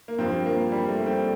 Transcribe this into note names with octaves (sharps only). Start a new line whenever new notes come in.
A#3
G2 F3 C4
A#3
G3
A3
C4